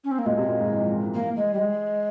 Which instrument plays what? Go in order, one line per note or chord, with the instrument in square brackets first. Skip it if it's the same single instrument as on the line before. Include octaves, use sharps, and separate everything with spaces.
[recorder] C#4
C4
A#3
[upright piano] A#2 [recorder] G#3
[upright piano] C3
A#2
G#2
E3
F3
E3
E3
[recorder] A#3
G#3
G3
G#3